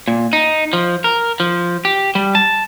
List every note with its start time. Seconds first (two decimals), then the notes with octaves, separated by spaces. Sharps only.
0.08 A#2
0.33 D#4
0.73 F3
1.04 A#4
1.40 F3
1.85 G4
2.15 G3
2.35 A5